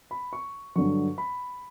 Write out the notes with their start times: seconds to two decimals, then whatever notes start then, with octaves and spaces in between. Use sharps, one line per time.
0.11 B5
0.33 C#6
0.76 G2 D3 F#3 C#6
1.18 B5